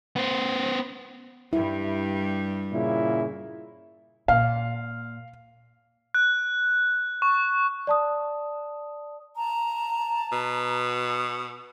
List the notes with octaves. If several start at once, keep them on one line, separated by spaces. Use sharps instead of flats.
B3 C5
G2 G3 E4
A#2 C#3 E4
A#2 F5
F#6
C#6
D5 A5 D#6
A5 A#5
B2